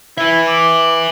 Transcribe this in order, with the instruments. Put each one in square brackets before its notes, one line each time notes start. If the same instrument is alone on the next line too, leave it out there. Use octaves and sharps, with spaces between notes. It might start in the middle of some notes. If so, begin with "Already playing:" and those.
[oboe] E4 [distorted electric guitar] B4 E5
[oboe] D6